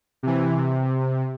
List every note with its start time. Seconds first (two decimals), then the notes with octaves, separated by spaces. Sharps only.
0.23 C3 E3
0.56 C3